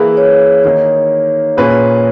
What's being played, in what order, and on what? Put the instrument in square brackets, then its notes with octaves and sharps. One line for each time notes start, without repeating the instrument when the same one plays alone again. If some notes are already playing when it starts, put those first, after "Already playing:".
Already playing: [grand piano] E3 A#3 E4 B4 [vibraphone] G#4
[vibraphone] C#5
[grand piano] D#3 A#3 D#4 [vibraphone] C#5
[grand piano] A#2 A#3 C#4 G#4 B4 [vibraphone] C#5